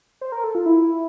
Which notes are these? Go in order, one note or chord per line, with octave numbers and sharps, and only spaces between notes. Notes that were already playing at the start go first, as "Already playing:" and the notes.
C5
A#4
A4
F4
E4